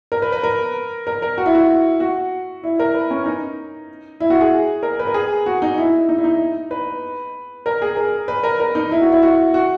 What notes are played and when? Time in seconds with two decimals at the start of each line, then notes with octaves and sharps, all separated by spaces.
0.12 A#4
0.22 B4
0.32 B4
0.43 A#4
1.07 A#4
1.22 A#4
1.38 F#4
1.46 E4
1.55 F#4
2.00 F#4
2.63 E4
2.79 A#4
2.95 B4
3.10 C#4
3.26 D#4
4.20 E4
4.30 F#4
4.41 G#4
4.83 A#4
4.99 B4
5.07 A#4
5.14 G#4
5.46 F#4
5.62 D#4
5.78 E4
6.09 D#4
6.18 E4
6.24 D#4
6.71 B4
7.66 A#4
7.82 G#4
7.97 A#4
8.28 B4
8.43 A#4
8.60 A#4
8.75 D#4
8.91 E4
9.01 F#4
9.12 E4
9.22 F#4
9.54 F#4